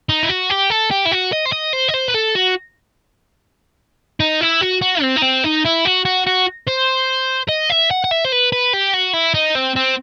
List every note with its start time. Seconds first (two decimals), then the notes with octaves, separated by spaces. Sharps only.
0.09 D#4
0.23 E4
0.29 F#4
0.50 G4
0.70 A4
0.91 G4
1.05 E4
1.11 F#4
1.32 D#5
1.45 C5
1.52 D#5
1.73 C5
1.88 D#5
1.94 C5
2.08 B4
2.14 A4
2.35 F#4
4.20 D#4
4.41 E4
4.61 F#4
4.82 F#4
5.02 C4
5.17 D#4
5.22 C4
5.44 D#4
5.65 E4
5.85 F#4
6.05 F#4
6.26 F#4
6.67 C5
7.49 D#5
7.70 E5
7.91 F#5
8.04 F#5
8.11 E5
8.25 C5
8.32 B4
8.52 B4
8.73 G4
8.94 F#4
9.14 E4
9.34 D#4
9.55 C4
9.76 C4